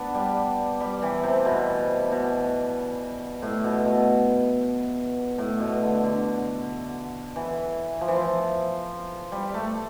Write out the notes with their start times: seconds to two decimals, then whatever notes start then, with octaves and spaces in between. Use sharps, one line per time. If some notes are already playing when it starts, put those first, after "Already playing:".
Already playing: B3 D4
0.15 G3
0.80 G3
1.02 E3
1.23 C3
1.45 B2
2.12 B2
3.42 A2
3.64 B2
3.85 B2
5.38 A2
5.60 B2
5.83 D3
6.04 D3
7.36 E3
8.01 F3
8.08 E3
8.16 F3
9.32 G3
9.54 A3